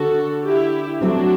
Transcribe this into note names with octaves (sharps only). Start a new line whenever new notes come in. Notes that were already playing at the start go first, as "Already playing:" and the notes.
Already playing: D3 F#4 A4
E4 G4
F#3 A3 C4 D4 F#4